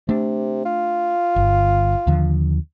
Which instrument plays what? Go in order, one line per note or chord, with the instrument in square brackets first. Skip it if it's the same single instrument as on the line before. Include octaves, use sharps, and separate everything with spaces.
[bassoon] C3 [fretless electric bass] A3 D4
[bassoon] F4
[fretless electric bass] G1
D#2 D3 F3